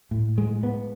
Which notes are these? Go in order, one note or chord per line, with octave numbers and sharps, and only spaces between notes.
A2
G#3
B3